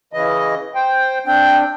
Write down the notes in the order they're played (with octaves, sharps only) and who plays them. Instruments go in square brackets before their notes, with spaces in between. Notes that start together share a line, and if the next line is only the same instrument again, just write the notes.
[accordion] C#3 E3 D#5
C5 G5
[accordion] C4 D4 [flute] G5